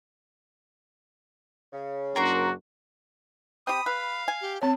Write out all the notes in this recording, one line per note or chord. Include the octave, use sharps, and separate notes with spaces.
C#3
F#1 F#2 D4 F#4 A#4 A#5 C6
C4 G4 B5 D#6
B4 F5
G#5
G4
C4 C#5 A5